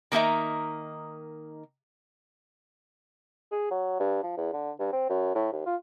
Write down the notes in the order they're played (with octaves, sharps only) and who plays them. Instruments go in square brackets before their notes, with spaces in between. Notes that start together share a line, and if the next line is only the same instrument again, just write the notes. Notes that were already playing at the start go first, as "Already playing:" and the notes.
[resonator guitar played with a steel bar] D#3 A#3 D#4 E5 A#5
[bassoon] G#4
F#3
G2
F3
E2
D3
G2
C4
F#2
A2
D#2
F4